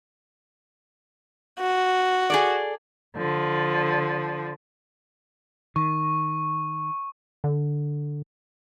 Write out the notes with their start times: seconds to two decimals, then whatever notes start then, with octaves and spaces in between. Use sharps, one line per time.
1.60 F#4
2.30 G#4 A4 D5
3.15 D3 F3
5.76 D#3 C#6
7.44 D3